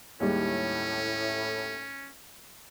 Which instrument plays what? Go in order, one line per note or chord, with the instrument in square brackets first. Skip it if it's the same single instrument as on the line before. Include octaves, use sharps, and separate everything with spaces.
[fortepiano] D#2 G3 G#3 [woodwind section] A2 [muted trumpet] C#4